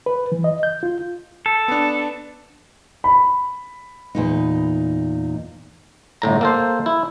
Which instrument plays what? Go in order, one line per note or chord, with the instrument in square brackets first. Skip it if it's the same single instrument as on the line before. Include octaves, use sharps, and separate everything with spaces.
[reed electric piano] B4
E3
D#5
G6
F4
[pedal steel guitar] A4
[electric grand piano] B3 D4
[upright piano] B5
[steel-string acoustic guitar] E2 A#2 D#4
[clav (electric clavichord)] G1 A2 A#5
A#3 A4 C5
E4